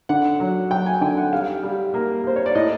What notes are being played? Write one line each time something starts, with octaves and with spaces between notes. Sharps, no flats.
D3 F#5
F#3
F#3 G5
G#5
D3 G5
F#5
G3 F5
G3
A#3
A#3 C5
C#5
D5
A2 D#5